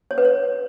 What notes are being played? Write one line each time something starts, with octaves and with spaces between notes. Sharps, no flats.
C#5
B4
C#5